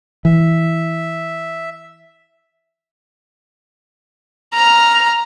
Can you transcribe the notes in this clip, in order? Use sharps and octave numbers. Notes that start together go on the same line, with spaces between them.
E3 E5
A#5 F6